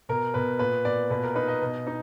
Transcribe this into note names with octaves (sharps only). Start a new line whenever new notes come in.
B2 A#4
B2 B4
A#2 B4
A#2 D5
B2 B4
A#4
D#4 B4
D#5
B2
D#4